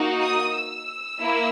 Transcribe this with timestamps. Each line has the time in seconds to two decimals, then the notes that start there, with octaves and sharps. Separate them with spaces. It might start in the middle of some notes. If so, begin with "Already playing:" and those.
Already playing: A#3 D#4 F#4
0.22 D#6
0.56 E6
1.21 A#3 E4